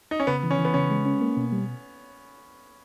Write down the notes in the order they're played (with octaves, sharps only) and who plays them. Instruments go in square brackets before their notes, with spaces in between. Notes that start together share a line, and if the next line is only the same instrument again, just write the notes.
[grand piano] D#4
C#4
[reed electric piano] C#3 [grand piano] B3
[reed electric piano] E3
[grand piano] C#4
[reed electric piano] E3
[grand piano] B3
[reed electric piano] C#3 [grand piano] C#4
[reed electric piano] G#3
C#4
A#3
B2
G3